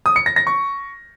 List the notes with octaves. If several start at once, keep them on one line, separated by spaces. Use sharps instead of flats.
D#6
C#7
A#6
A#6
C#6